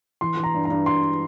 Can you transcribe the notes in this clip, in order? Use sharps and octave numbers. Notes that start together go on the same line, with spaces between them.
E3 C6
E3
A#5
G2
G2 A#5
G2 C6